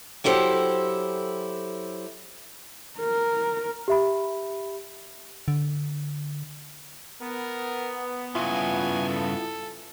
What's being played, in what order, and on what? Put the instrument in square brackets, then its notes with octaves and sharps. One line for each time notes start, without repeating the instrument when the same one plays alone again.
[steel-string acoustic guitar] F#3 E4 G4 A4 C5
[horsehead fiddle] A#4
[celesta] G4 E5 B5
[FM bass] D3
[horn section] B3 [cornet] A#4
[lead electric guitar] G2 C#3 [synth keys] E4 F4 E5 [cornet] G#5
[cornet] A4